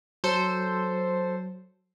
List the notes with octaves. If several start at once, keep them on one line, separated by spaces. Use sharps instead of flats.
F#3 A4 C5